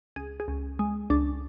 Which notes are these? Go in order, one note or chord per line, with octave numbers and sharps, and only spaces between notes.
C#2 G#4
G#4
C#2
G#3
C#2 D4